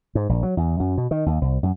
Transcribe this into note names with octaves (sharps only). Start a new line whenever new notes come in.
G#2
A#1
F#3
E2
F#2
B2
D#3
D#2
C2
F#2